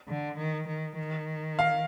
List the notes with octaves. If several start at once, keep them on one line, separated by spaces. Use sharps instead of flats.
D3
D#3
D#3
D#3
F5